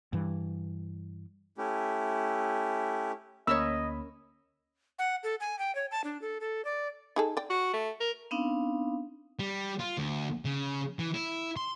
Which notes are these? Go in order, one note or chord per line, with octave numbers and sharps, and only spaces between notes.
G2 E3
A3 C#4 E4 G4
D2 A#3 C#4 A#4 C#5 D#5 B5 E6
F#5
A4
G#5
G5
C#5
A5
D4
A4
A4
D5
D#4 G#4 A4
D5 G5
F#4
A3
A#4
B3 C4 D4 D#4 F5
G3
F4
D2
C#3
E3
E4
C6